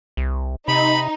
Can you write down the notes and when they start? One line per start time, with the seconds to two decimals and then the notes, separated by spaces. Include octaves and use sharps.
0.17 C2
0.68 C3 D#4 B5